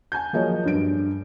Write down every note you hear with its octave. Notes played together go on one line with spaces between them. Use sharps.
G#5 A5 G6
F3 F#3 A#3 G#4 C#5 D#5
G2 D7